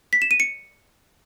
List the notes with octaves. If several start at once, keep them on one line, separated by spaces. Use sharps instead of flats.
B6
E7
D#7
C#7